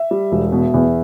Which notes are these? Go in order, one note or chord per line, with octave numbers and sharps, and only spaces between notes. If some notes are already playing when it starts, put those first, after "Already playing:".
Already playing: E5
G3
E1
B2
E2